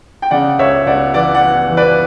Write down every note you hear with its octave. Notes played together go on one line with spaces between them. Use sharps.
G5
C#3 D5 F#5
C#2 C#5 E5
C#2 D5 F#5
E3 D5 F#5
D5 F#5
E3
E3
B4 D5